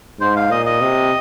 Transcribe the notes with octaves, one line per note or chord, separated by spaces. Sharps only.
G#2 C5
F5
A#2 D#5
D#5
C3